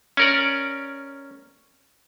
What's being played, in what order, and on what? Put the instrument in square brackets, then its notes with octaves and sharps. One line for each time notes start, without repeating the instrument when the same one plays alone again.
[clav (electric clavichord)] C#4 A#4 D5